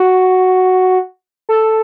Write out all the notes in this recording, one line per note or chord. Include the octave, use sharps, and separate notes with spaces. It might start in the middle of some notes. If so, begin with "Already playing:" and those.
Already playing: F#4
A4